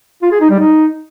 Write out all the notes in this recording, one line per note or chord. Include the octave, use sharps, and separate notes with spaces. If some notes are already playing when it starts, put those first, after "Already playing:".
F4
G#4
D#4
G3
D#4